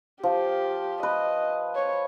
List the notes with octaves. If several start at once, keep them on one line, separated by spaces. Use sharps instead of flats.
F3 G4
B4 D#5
C#5